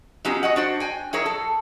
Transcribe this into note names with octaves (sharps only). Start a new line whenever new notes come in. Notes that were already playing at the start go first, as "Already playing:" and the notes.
F#3 B3 C#4 D#4 F4 G4
F#4 D#5 F#5
D4 F#4 C5
G5 G#5
F#3 E4 G#4 A#4 C#5
A4